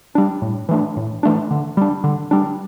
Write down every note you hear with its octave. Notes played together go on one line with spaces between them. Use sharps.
G3 D4
A2
E3 A3 D4
A2
E3 A3 D4
D3
G3 D4
D3
G3 D4